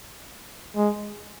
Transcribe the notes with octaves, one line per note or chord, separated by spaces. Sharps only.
G#3